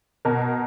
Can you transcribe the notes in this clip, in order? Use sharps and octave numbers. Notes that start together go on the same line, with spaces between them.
B2 A#4